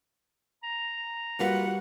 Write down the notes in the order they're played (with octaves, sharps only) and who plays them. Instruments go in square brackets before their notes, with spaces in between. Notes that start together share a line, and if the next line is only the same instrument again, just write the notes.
[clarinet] A#5
[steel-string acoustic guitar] G3 F#4 [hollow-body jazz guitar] A#3 F4 B4 [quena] F#5